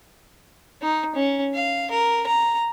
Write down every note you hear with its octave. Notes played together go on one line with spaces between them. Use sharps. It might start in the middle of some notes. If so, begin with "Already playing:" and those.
D#4
C#4
F5
A#4
A#5